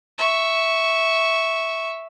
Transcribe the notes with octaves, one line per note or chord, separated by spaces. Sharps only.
E5 C#6